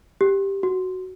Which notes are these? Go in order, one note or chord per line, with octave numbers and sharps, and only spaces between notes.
G4
F#4